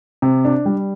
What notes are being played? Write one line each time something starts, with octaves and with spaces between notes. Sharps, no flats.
C3
D4
G3